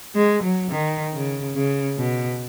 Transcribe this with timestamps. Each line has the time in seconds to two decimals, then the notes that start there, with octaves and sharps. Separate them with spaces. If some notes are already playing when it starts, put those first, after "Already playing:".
0.15 G#3
0.43 F#3
0.71 D#3
1.14 C#3
1.56 C#3
1.98 B2